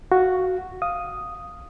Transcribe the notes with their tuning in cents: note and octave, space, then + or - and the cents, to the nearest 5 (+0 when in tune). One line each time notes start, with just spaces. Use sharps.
F#4 +0 F5 +0
F5 +5 D#6 +0